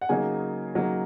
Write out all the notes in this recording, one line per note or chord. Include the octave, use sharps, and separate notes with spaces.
F#5
C#3 F#3 A#3 D#4 G#5
C#3 F#3 A#3 D#4